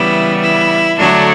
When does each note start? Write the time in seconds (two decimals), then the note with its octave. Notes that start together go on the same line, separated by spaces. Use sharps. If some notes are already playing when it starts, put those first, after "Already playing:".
Already playing: C#3 E3 G3 B3 E4
0.41 E4
0.98 D3 F#3 A3 D4